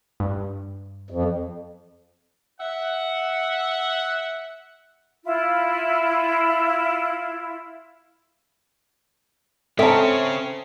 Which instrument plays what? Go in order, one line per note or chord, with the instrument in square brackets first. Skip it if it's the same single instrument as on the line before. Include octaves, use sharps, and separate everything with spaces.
[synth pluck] G2
[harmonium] F2
[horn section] E5 F#5
[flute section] E4 F4
[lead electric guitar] C#3 C#4 [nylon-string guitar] C4 [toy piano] A4 A5 [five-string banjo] E5 A#5